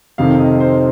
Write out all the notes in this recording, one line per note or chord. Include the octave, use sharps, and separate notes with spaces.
F2 C3 D#3 F5
D#5
C5